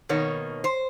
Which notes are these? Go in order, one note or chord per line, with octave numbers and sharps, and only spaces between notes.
B2 D#3 A#3 C#5
C5